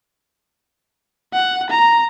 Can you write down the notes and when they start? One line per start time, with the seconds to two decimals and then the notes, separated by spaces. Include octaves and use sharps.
1.33 F#5
1.70 A#5